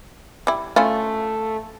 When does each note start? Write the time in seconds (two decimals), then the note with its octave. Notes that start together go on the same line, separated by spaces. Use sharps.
0.47 G3 E4
0.76 A3 C#4 E4 F4